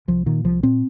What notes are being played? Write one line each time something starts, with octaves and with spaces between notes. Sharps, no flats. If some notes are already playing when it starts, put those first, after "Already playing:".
C2 F3
A#2 D#3
C2 F3
A#2 C4